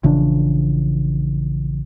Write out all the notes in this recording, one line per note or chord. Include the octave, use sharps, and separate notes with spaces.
A#1 C#3 E3 D4